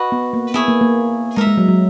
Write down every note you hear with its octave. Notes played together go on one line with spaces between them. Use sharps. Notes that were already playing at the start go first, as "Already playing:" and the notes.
Already playing: F#4 B4 D#5
B3
A#3
B3 E4 G#4 C#5
A#3
A#3
G#3 D#4 A#4 E5
G#3
F#3
F#3